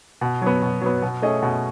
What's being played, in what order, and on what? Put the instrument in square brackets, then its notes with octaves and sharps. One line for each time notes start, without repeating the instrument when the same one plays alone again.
[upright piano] B2
F#3 B3
B2
F#3 B3
B2
A3 C#4 G#4 D#5
B2